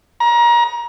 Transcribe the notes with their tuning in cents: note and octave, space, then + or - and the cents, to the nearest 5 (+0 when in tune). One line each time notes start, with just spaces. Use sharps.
A#5 +30